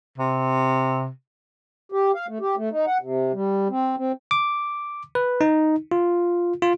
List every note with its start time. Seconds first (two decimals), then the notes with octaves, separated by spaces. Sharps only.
0.18 C3
1.92 G4
2.15 F5
2.28 A3
2.41 G4
2.57 A3
2.71 D#4
2.87 F#5
3.01 C3
3.33 G3
3.70 C4
3.97 C4
4.31 D6
5.15 B4
5.41 D#4
5.92 F4
6.62 F4